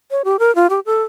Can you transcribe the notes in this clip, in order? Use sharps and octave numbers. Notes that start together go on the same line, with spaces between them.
C#5
G4
A#4
F4
G4
A4